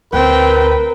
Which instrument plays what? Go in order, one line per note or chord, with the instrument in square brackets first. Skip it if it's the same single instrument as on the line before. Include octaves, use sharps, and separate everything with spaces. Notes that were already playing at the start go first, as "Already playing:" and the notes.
[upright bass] D2 [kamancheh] C4 G5 [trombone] A#4 [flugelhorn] B4